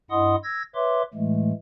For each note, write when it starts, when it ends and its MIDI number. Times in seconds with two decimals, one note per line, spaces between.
0.11 0.36 43
0.11 0.36 64
0.11 0.36 75
0.11 0.36 78
0.11 0.36 84
0.11 0.36 87
0.44 0.63 88
0.44 0.63 92
0.44 0.63 94
0.75 1.02 71
0.75 1.02 73
0.75 1.02 76
0.75 1.02 84
0.75 1.02 86
1.14 1.52 45
1.14 1.52 52
1.14 1.52 56
1.14 1.52 57